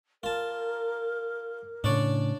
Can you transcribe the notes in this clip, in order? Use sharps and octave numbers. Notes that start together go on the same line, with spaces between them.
F4 A#4 A5
A2 C#3 D4 C#5 D5